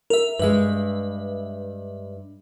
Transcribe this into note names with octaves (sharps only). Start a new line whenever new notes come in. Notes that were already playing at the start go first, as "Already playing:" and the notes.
A#4 E5
G2 G#3 B4 E5